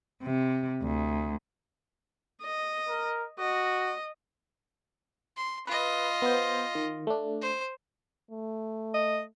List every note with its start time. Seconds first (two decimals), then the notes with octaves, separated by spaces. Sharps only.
0.23 C3
0.82 D2
2.41 D#5
2.88 A#4
3.39 F#4 D#5
5.37 C6
5.67 F4 B4 D#5
6.22 B3 C5
6.75 D#3
7.07 A3 D4
7.42 C5
8.31 A3
8.94 D#5